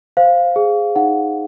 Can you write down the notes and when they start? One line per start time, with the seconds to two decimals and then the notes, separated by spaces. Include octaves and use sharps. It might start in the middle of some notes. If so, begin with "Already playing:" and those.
0.17 C5 F5
0.56 G#4
0.96 D#4 F#5